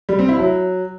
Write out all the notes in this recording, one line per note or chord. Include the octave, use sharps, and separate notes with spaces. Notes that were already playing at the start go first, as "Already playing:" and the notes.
G3
C4
E4
F#3